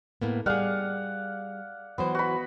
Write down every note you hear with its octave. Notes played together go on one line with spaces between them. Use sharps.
A2 A#3 B3
G3 G#4 D5 F5 F#5
E3 F#3 B3 C5
F#4 B5